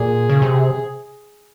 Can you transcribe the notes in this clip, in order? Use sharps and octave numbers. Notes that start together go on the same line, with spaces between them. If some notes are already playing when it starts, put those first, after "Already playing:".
Already playing: A#2 G#4
C#3
C3